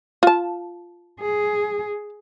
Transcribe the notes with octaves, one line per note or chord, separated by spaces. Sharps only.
F4 A5
G#4